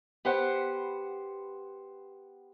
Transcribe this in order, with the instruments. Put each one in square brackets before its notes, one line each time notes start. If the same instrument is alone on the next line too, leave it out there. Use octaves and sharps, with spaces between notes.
[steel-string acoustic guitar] B3 G4 C5 F#5